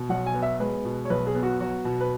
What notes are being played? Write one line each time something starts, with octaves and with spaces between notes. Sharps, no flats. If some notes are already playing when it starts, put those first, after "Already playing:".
Already playing: B2
B1 F#5
G#5
B3
E5
G#3 B4
B2
C#5
B1 B4
G#4
B3
F#4
F#3 F#4
B2
B4